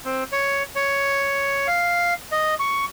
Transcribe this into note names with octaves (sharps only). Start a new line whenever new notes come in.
C4
C#5
C#5
F5
D#5
C#6